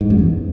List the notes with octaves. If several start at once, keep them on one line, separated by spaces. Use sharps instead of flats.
G#2
F#2
E2